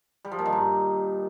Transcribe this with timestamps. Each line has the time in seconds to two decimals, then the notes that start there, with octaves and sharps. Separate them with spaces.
0.25 G3
0.32 F3
0.39 A#2
0.46 D#3
0.53 G2